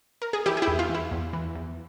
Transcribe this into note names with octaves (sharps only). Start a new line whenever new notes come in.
A#4
G#4
E3 E4 G4
G#4
E4 G4
E2
F4
E3 E4
E2
E3
E2